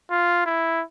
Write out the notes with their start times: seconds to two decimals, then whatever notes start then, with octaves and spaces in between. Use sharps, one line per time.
0.10 F4
0.46 E4